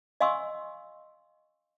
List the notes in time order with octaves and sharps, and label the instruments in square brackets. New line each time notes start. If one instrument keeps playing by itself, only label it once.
[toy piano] D#5 F5 G#5 C6 C#6 E6